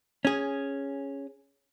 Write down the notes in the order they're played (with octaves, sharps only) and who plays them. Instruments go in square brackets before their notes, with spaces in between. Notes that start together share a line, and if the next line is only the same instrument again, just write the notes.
[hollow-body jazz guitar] C#4 G#4